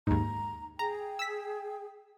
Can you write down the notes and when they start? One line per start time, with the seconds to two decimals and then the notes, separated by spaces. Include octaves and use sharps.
0.07 D#2 G#2 A#5
0.79 G#4 G5 A#5
1.19 E6 B6